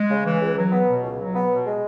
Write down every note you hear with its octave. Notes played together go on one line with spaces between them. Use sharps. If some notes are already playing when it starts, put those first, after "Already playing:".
Already playing: G#3
C#3
E3
C#2
F#3
B3
B2
C#2
F#3
B3
B2
G#3